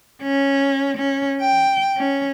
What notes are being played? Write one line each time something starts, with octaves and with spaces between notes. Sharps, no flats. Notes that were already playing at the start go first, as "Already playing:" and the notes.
C#4
C#4
G5
C#4